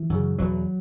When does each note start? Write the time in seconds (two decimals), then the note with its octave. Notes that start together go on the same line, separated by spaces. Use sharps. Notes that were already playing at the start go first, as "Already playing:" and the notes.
Already playing: E3
0.10 F#2 C#3
0.38 E2 B2 F#3